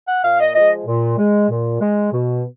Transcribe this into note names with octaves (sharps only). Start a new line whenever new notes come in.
F#5
A#2 F5
D#5
F3 G#3 D#5
A#2
G#3
A#2
G#3
B2